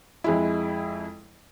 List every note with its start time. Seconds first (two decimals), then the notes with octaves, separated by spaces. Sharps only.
0.24 F2 G#3 E4